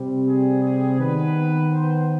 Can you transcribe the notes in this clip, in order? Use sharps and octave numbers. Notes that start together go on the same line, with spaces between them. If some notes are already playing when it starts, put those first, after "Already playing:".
Already playing: C3 G3 C4
G#4
G#4
D#3 B3 B4
C5